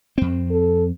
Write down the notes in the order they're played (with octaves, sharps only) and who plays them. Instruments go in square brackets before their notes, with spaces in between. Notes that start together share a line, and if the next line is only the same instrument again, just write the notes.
[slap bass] F2 C4
[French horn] A4